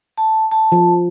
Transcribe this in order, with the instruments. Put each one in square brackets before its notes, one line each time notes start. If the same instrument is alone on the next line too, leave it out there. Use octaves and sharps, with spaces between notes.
[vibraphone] A5
A5
[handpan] F3